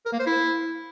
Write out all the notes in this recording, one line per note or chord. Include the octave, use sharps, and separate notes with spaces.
A#4
A#3
C5
E4